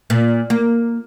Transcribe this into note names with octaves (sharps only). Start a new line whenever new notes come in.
A#2
A#3